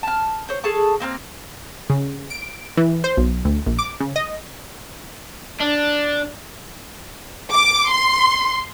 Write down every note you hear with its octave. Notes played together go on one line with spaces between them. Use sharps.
A5 F6
C5 C#5
G#4 A4 A5 C#6
A#3 C4 G#5 F6
C#3
D7
E3
C5
B1
D2
A#1
D6
C#3
D#5
D4
D6
C6